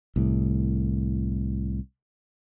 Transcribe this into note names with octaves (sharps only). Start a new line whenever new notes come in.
C2 A2